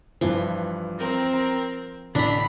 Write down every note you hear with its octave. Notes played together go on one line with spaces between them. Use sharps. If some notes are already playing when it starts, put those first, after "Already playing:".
G2 E3 F3
C4 A#4
A#5
A1 D3 D4 A#5 B5